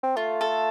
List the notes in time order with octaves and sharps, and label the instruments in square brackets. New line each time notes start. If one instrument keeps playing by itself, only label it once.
[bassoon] C4
[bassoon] A3 [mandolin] F4
[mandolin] A4